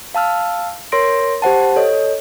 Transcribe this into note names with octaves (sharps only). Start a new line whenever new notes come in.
F5 A5 E6 F6
A#4 C#5 C6 A#6 D7
G4 C5 F#5 A5
A4 C#5 D#5